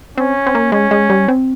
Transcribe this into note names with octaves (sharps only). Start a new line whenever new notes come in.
C4 C#4
C4
A#3
G#3 C#4
G#3
G3
C4